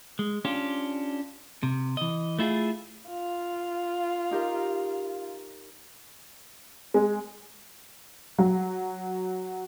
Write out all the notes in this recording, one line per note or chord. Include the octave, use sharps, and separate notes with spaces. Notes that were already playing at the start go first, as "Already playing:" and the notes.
G#3
C#4 D4 F4 G4
C3
E3 D#5
A3 E4 F4 G#4
F4
D#4 G4 A#4
G#3
F#3